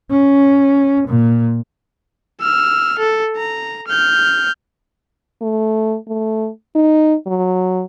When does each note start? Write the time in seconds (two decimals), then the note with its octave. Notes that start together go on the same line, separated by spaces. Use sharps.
0.11 C#4
1.08 A#2
2.41 E6 F6
2.99 A4
3.36 A#5
3.88 F6 G6
5.42 A3
6.08 A3
6.75 D#4
7.27 F#3